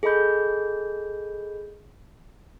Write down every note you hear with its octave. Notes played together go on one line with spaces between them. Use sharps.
G#4 A4 D#5 B5 G6